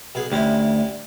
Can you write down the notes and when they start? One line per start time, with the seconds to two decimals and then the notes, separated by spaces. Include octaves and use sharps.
0.15 B1 B3 G#4
0.32 D2 G3 C#4 E4